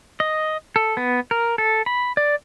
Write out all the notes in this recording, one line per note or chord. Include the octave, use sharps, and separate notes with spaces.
D#5
A4
B3
A#4
A4
B5
D5